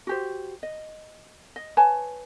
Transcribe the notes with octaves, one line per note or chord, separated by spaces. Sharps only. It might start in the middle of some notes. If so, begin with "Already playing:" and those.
F#4 G4 C5
D#5
D#5
B4 C#5 G#5 A5